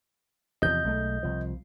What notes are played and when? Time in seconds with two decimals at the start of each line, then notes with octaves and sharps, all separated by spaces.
0.62 E2 C3 F3 D#5 G6
0.84 B1 G#3 A3
1.23 C2 F3